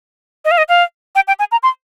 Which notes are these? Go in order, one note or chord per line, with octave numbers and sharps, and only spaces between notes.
D#5
F5
D#5
F5
G5
G5
G#5
A#5
C6